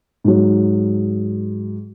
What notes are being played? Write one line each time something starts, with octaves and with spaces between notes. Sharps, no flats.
G#2 F#3